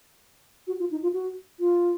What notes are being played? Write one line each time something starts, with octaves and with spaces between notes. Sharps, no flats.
F#4
F4
D#4
F4
F#4
F4